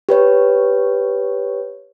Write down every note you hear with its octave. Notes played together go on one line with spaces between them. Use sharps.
G4 B4 C#5